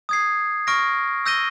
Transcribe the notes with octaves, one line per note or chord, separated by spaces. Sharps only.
D#6 G#6 C7
C#6 F6 A#6 D7
E6 G6 A#6 D#7 G7